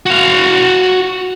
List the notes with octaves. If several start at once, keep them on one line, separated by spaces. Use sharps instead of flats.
F#4 F5